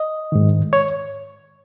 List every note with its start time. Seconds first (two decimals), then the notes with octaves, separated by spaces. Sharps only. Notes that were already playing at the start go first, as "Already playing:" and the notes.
Already playing: D#5
0.32 G#2 D#3
0.73 C#5